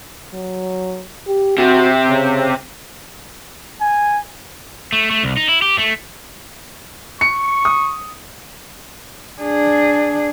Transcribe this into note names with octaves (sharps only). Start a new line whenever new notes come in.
F#3
G4
C3 F#4
C#3
G#5
A3
A3
C2
D#4
E4
G4
A3
C#6 C#7
D#6
D4 G#4